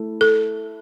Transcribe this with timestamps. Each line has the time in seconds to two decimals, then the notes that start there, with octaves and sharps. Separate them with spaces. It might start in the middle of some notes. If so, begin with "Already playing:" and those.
Already playing: A3 E4
0.21 A4